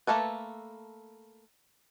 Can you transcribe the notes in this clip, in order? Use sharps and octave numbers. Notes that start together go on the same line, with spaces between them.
A3 A#3 A4 B4